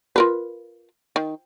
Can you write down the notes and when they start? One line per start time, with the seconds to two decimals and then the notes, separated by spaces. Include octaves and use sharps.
0.16 F4 A#4 B4
1.16 D#3